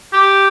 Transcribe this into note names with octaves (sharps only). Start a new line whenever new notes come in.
G4